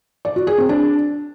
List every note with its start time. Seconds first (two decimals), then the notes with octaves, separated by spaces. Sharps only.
0.25 D5
0.36 F#4
0.47 G#4
0.58 C4
0.69 D4